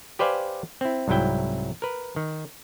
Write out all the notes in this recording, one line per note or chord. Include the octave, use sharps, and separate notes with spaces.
G4 B4 C5 D5 F5 G#5
C4 E4
C2 G#2 F#3 E4 G5
A#4 B4
D#3